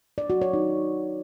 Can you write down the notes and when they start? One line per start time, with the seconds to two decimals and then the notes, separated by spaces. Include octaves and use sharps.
0.18 D5
0.30 F#4
0.42 C#5
0.53 D#4